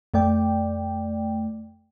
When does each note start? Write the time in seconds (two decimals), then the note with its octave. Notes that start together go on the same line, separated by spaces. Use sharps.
0.14 F2 A3 D5 G5